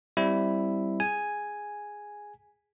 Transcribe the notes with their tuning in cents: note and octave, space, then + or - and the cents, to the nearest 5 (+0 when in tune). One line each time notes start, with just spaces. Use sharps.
G3 +0 C4 +0 E4 +0
G#4 -5 G#5 +0